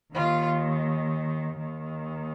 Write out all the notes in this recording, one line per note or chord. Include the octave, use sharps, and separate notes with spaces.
D#2 D#3 F4
D#2 D#3